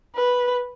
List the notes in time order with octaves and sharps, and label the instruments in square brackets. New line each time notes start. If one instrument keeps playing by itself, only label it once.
[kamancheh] B4